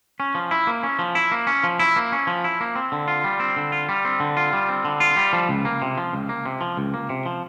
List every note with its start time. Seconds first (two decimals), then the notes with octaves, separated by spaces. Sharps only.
0.20 C#4
0.35 F3
0.51 E4
0.67 A#3
0.83 C#4
0.99 F3
1.15 E4
1.32 A#3
1.47 C#4
1.64 F3
1.80 E4
1.96 A#3
2.12 C#4
2.27 F3
2.44 E4
2.60 A#3
2.76 C4
2.92 D3
3.08 F4
3.24 G3
3.40 C4
3.57 D3
3.72 F4
3.89 G3
4.05 C4
4.20 D3
4.37 F4
4.53 G3
4.69 C4
4.85 D3
5.00 F4
5.17 G3
5.33 F3
5.49 C#2
5.65 A#3
5.82 C3
5.98 F3
6.13 C#2
6.29 A#3
6.46 C3
6.61 F3
6.77 C#2
6.94 A#3
7.10 C3
7.26 F3